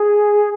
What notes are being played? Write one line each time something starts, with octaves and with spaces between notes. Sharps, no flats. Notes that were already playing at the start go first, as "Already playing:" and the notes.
Already playing: G#4